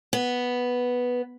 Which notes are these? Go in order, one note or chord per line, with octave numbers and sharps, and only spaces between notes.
B3